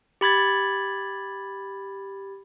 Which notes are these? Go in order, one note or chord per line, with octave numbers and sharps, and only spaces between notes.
G4 B5 G#6 A6